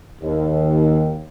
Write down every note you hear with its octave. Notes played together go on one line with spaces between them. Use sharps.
D#2